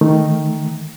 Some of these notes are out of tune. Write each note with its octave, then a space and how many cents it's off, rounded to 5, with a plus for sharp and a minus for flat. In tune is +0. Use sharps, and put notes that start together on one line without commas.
D#3 +0 A3 +0